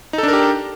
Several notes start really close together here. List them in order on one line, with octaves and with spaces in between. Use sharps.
D#4 A4 D4 A#4 G4